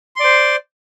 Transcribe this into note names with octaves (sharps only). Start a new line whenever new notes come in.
C5 D5 C6